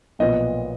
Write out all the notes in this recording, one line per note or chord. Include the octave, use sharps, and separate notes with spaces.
B1 A#2 F3 B3 D#5